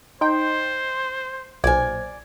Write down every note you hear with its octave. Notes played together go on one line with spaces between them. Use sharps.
D#4 C5 G5 C6
B1 A#2 C5 D5 G#5 G#6